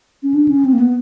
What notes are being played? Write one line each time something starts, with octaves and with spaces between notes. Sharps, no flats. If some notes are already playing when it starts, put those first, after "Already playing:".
C#4
D4
C#4
C4
A#3
B3